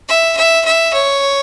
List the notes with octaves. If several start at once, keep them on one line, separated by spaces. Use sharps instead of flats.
E5
E5
E5
C#5